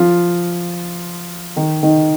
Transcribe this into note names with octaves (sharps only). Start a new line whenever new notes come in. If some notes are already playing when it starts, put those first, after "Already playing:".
Already playing: F3 F4
D#3 D#4
D#3 D#4